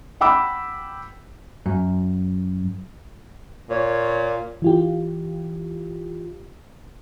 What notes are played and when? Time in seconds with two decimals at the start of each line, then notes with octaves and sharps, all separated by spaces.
0.21 F#5 G5 B5 D6 E6
1.66 F#2
3.69 A#2 C#5
4.62 E3 F4 G4